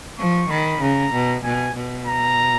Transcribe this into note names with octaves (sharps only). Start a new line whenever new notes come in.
F3 C#6
D#3 B5
C#3 A#5
B2
B2 G#5
B2
A#5